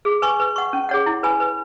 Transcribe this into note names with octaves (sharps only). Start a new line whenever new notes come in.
G#4
B4 G#5 C#6
B4
F#5 C#6
C#4
G#4 C#5 F#5
E4
B4 G#5 B5
B4